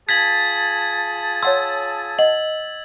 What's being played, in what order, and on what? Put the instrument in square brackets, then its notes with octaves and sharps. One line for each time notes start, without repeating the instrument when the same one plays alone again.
[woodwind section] F4 G#4 A5 [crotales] G#6 A6 F#7 [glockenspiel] B6
[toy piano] C#5 F#5 C6 [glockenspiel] E6
[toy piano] D#5 F#5 [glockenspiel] F#7